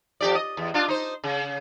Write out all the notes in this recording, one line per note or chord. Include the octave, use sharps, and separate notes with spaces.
F2 G4 D5
D#5
E2
D4 F4
D#4 C5
C#3